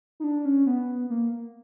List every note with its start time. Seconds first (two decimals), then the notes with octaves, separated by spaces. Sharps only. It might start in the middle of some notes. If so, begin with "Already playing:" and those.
0.20 D#4
0.24 D4
0.45 C#4
0.66 B3
1.10 A#3